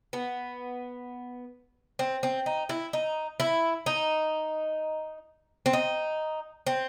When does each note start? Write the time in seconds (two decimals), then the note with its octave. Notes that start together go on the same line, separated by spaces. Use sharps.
0.13 B3
1.99 C4
2.23 C4
2.46 D#4
2.69 E4
2.93 D#4
3.40 E4
3.86 D#4
5.66 C4
5.73 D#4
6.66 C4